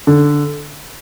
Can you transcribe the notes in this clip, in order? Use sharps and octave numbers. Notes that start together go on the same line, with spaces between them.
D3